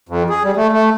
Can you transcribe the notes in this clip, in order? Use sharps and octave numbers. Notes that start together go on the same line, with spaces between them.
F2
G#4
G3
A3
A3